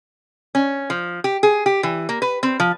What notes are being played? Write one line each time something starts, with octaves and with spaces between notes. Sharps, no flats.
C#4
F3
G4
G#4
G4
E3
A#3
B4
C4
F3